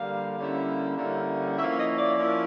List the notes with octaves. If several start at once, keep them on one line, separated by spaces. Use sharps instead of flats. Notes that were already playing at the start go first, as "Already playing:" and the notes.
Already playing: D3 G3 A#3 F5
D3 G3 A#3 C#4 E4
D3 G3 A#3 C#4 E4
F3 A#3 C#4 E4 E5
D#5
D5
F3 A#3 C#4 E4